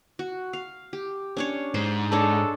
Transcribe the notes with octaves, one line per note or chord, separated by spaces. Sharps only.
F#4
F5
G4
C#4 D4 C#5
G#2 C5
G#3 D4 A4 C#5